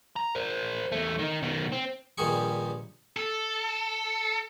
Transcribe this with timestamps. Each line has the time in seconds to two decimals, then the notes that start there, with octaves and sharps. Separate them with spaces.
0.16 A#5
0.35 A#4 C5
0.92 E2 A3
1.19 D#3 D#4
1.43 B2 D#3
1.72 C4
2.18 A#1 G2 D#3 G3 G#4 C#6
3.17 A4